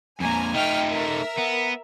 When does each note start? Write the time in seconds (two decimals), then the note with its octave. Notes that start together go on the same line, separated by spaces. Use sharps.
0.20 F2 A#2 G#5 A#5
0.54 A3 D#4 G5 F6
0.91 A#4 E5
1.38 B3